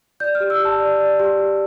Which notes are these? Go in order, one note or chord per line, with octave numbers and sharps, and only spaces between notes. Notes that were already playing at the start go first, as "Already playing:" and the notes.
D5 G6
F6
G4
E6
G4 A5
D5
D5
G4
G4